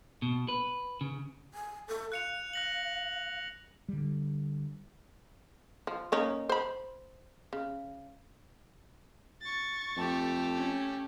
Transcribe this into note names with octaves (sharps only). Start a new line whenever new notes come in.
B2
B4
C#3
G#5
A4
F5 F#6 C#7 F7
F#6 A#6 F#7
D3 G3
F3
A#3 C#4 D#4
C5 B5
C#3
C#6 A6
F2 A3 G4
C#4